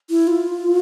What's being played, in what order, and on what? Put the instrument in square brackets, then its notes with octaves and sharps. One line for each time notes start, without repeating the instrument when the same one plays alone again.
[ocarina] E4
F4